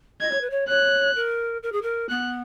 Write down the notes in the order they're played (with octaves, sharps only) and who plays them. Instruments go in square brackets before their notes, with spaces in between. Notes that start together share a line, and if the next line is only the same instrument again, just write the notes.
[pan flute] D#5 [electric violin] G#6
[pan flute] C#5
B4
C#5
[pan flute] C#5 [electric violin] F#6
[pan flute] A#4
A#4
G#4
A#4
[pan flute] B3 [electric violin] F#6